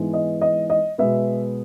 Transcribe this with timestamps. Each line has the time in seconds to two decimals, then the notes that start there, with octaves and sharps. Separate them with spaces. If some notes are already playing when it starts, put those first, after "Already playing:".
Already playing: G#2 E3 G#3 B3
0.13 D#5
0.41 D#5
0.70 D#5
0.98 B2 G#3 B3 E5